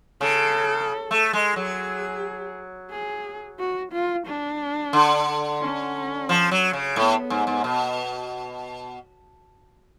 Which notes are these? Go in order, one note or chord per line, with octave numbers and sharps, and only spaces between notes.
C#3 A4
A3
G#3
F#3 G#4
G#4
F#4
F4
D4
D3
C#4
F3
F#3
C#3
A2 B3
G#2
G#2
B2